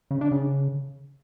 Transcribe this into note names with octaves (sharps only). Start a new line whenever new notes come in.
C#3
D4
C#3